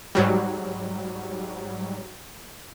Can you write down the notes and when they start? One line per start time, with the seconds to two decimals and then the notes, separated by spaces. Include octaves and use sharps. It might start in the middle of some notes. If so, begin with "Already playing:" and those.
0.15 G#2 F#3 G3